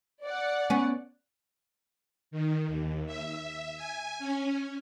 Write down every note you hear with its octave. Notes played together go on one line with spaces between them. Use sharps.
D5 F#5
B3 C#4
D#3
D#2
E5
G#5
C#4